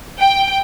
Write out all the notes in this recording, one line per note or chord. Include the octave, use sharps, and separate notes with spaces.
G5